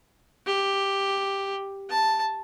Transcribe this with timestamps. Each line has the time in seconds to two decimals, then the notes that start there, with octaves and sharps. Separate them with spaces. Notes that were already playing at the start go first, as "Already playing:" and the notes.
0.47 G4
1.89 A5